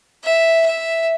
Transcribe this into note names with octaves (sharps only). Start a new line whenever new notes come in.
E5
E5